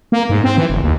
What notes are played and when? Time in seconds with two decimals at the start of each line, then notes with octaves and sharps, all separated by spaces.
0.12 A#3
0.30 G#2
0.44 C4
0.57 E3
0.70 F#1
0.83 D#2